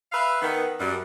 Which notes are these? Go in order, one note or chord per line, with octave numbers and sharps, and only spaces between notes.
B4 E5 F5
D#3 B3
F#2 G3